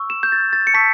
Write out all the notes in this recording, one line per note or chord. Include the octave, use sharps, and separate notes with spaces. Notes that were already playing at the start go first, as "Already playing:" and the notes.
Already playing: C#6 E6
E7
G6
A6
A6
C#7
A5 C#6 E6 B6